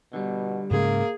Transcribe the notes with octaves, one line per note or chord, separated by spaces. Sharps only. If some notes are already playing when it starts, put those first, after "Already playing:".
B2 D3 G3
G#2 C#3 G#3 A#3 G#4